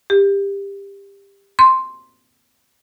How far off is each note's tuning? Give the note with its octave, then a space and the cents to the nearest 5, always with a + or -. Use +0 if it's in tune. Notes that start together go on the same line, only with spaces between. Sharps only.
G4 +20
C6 +0